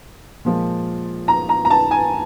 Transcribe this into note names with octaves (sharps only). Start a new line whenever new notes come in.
A#2 F3 G#3
A#5
A#5
A#5
A5
G#5